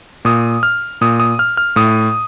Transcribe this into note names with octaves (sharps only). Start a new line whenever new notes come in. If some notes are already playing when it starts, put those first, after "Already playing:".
A#2 D#6
F6
A#2 D#6
D#6
F6
F6
A2 D#6